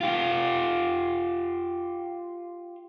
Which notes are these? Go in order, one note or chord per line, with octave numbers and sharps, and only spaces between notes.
F4 G4